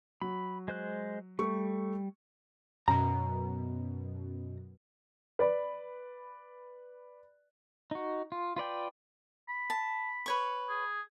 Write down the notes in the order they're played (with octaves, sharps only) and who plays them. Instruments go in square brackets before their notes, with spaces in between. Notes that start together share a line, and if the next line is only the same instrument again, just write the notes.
[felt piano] F#3 [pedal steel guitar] B5
[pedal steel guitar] G#3 C5 F#6
[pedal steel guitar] G3 [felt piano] A3 C#6
[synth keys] F#2 B2 [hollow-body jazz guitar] A#5
[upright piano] B4 D5 B5
[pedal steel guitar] D#4 F#4
F4
F4 B4 D5 G5
[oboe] B5
[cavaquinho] A5
B4 C#5 C#6
[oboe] G#4